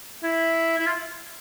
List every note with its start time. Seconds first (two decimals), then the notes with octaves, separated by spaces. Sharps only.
0.23 E4
0.78 E4
0.86 F4